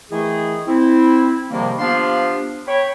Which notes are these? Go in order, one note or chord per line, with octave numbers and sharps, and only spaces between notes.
D#3 E3 A3 E4 G#4
C4 E4
G#2 C3 D#3 F3 G3 A#3
F3 B3 D4 G4 F5 C6
C#5 G5 B5